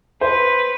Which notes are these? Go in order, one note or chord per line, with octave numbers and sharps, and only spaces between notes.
B4 C5